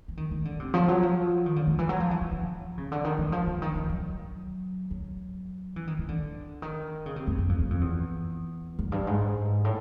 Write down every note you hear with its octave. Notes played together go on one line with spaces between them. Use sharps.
E3
D#3
D#3
D3
C3
F3
F#3
F3
D#3
D3
D#3
E3
F#3
F3
E3
F3
F3
C#3
D3
D#3
E3
F3
D3
D#3
D#3
F#3
F#3
E3
D#3
D#3
D3
D#3
C#3
C3
F#2
F#2
F2
F#2
F2
E2
F#2
G2
G#2
A2